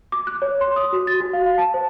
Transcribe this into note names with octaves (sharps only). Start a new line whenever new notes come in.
D6
F#6
C#5
C6
D#6
F#4
A6
F#4
F5
F5
A5
C5